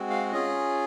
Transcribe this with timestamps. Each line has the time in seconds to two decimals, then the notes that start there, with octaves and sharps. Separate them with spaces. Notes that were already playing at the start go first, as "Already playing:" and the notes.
Already playing: G#3 C4 F#4
0.10 F5
0.31 C#4 F4 G#4 D#5